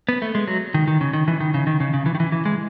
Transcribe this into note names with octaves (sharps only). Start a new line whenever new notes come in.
B3
A3
G#3
F#3
D#3
D#3
C#3
D#3
E3
D#3
C#3
D#3
C#3
C#3
E3
D#3
E3
E3
G#3